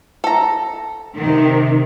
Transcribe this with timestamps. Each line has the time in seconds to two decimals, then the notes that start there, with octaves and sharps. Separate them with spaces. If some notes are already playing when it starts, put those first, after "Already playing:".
0.24 A4 A#5
1.18 C3 D#3